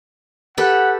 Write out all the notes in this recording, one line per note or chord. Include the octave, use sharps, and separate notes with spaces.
G4 A4 B4 F#5